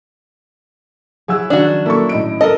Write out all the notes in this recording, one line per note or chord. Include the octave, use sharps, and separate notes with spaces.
F#3 E4 G#4 F#5 E6
D#3 C#4 D4 F#4
A#3 E4 A4 C#6
A2 D#5 D7
A4 A#4 D#5